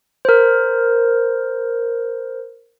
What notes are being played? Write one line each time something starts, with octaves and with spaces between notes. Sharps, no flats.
A#4 C5